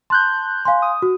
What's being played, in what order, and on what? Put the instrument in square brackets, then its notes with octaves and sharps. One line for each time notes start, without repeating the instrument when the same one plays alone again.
[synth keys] A5 F#6 G6 [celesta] C6
[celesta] F5 G#5 C6
[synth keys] D#6
[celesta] F#4